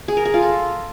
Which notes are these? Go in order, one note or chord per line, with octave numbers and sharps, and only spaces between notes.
G#4
A#4
G#4
F4
A4